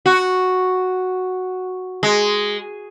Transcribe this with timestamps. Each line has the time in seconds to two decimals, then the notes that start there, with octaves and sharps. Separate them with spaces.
0.06 F#4
2.03 G#3